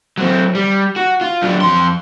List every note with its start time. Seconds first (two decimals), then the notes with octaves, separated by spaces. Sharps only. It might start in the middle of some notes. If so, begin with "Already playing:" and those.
0.18 F#3 C4
0.55 G3
0.96 F#4
1.21 F4
1.43 F#3 D4
1.61 F2 C6